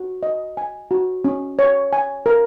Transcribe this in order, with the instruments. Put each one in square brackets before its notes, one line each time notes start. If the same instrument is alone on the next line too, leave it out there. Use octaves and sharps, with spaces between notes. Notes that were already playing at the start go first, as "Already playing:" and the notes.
Already playing: [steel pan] F#4
D#5
G#5
F#4
C#4
C#5
G#5
A#4